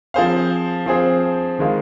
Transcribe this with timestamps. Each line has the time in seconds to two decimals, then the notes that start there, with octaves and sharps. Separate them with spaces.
0.14 F3 C4 G#4 C5 F5
0.86 F3 C4 G#4 C5 F5
1.59 D#3 G#3 F4